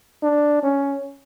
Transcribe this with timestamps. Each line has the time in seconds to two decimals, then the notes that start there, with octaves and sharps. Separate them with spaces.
0.23 D4
0.63 C#4